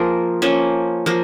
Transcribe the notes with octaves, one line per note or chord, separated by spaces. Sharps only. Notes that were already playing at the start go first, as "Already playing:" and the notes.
Already playing: F3 A#3 G#4 A#4
F3 A#3 C#4
F3 A#3